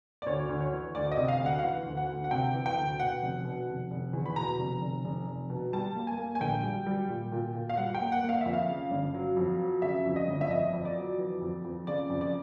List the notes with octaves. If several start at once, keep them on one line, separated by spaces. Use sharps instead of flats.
D5
D2 C#5
D2
C#5
E3
D2 D5
D#5
C3
F5
D2
F#5
F5
E3 F#5
D2
F#5
D2
F#5
C3 G5
E3
G5
D2
B2 F#5
F1
B2
F1
F1
E2
B5
B2 A#5
F1
F1
F1
F1
B2
G3 A5
A#3
G#5
A#3
G#5
A#1 G5
G3
G3
A#2
A#2
A#2
F5
G3 F#5
G5
A#3
F#5
A#3
F5
F2 E5
F5
C#3
G1
F#3
F2
F#3
C#3 E5
F2
D#5
G1
E5
F2 D#5
F2
D5
F#3
E3
F2
F2
C#3 D5
F2
D5